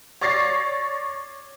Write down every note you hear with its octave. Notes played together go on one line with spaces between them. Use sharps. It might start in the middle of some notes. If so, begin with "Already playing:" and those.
C#5 D5 C#6 A6 A#6 C7